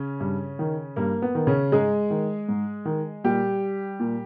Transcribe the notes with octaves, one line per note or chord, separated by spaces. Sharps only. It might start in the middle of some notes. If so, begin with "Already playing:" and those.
Already playing: C#3 C#4
G2
D#3
G2 A#3
B3
D#3
C#3 C#4
G#2 G#3 G#4
D#3
G#2
D#3
A#2 G3 G4
A#2